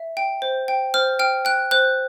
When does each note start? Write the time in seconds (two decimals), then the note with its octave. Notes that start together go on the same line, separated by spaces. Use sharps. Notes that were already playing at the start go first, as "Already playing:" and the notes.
Already playing: E5
0.17 G5
0.42 C5
0.68 G5
0.94 C5 F6
1.19 G5 F6
1.45 G5 F#6
1.71 C5 F#6